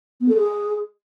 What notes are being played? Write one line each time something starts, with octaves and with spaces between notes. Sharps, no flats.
B3
A4
G#4